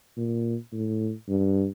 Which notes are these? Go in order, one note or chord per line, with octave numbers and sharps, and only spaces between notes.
A#2
A2
G2